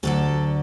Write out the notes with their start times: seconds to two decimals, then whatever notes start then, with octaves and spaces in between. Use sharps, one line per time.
0.03 D2 D3 F#3 A4